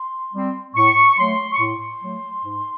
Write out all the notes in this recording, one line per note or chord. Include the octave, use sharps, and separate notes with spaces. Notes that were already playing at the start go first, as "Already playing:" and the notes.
Already playing: C6
G3 C4
A2 C#6
F#3 A3 C6
C#6
A2 C6
F#3 A3
G#2